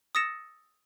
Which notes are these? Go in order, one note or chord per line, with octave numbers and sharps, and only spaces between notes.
D#6 E6 A6 A#6 C#7 E7